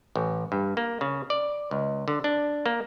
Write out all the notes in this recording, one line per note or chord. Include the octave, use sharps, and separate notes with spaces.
A1
G2
A#3
C#3
D5
C#2
D3
D4
A#3